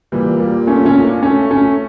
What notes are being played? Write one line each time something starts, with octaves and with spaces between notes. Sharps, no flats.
A#2 E3 G3
G3 A#3
A3 C#4
A3 C#4
A#3 D4
A3 C#4
A3 C#4